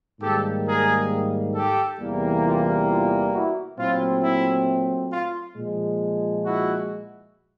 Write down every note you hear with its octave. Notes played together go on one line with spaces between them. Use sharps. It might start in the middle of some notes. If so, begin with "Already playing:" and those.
G#2 D#3 G3 A#3 G4 A4
G#4 A#4
G4 A4
E2 C3 E3 G3 A#3
F4 G4
F4
E4 F#4
A#2 F#3 A3 C4 E4 F4
E4
F4
A#2 F3 G#3
E4 F#4